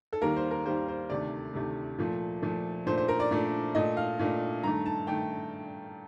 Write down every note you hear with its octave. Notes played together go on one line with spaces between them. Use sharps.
A4
D#2 D#3 G3 A#3 A#4
C5
A#4
D#2 D#3 G3 A#3 C5
C5
D2 C3 D#3 A3 D5
D2 C3 D#3 A3
A#2 F3 A3
A#2 F3 A3
A#2 A3 D4 C5
C5
A#4
D5
A#2 A3 D4
A#2 A3 D4 D#5
F5
A#2 A3 D4
G2 D#3 A3 A#5
A5
G2 D#3 A3 G5